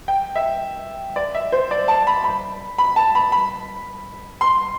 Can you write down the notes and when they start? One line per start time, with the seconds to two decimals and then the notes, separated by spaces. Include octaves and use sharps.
0.08 G5
0.36 E5
1.16 D5
1.35 E5
1.52 C5
1.71 D5
1.88 A5
2.07 B5
2.24 B5
2.78 B5
2.96 A5
3.15 B5
3.32 B5
4.41 C6